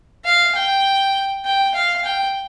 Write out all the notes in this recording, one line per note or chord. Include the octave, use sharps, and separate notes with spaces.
F5
G5
G5
F5
G5